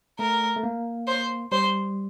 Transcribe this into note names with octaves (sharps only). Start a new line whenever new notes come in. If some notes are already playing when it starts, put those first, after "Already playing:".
A3 A#4
A3
A#3
C5
G3 C5